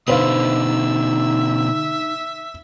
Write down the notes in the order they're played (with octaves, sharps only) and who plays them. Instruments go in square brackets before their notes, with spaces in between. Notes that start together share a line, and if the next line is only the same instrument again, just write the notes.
[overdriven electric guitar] B2 D3 [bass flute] D#4 [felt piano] B4 C5 F5 [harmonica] E5